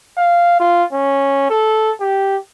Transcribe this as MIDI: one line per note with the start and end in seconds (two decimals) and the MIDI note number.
0.17 0.58 77
0.60 0.84 65
0.93 1.49 61
1.50 1.91 69
2.00 2.37 67